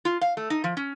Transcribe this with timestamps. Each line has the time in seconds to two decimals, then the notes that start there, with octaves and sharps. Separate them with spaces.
0.05 F4
0.21 F5
0.37 A3
0.50 D#4
0.64 F3
0.77 C#4